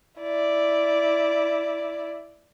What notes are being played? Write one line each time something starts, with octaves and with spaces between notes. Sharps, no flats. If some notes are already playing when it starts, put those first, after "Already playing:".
E4 D5